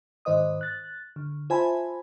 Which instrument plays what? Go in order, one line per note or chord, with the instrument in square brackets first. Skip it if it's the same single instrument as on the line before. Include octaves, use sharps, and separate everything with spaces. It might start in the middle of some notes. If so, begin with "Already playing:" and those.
[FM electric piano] G#2 D#3 C5 D#5 D#6
F#6 A6
D3
F4 C5 E5 G#5 A5 B5